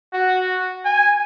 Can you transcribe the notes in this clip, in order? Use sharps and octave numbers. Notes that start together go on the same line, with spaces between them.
F#4
G#5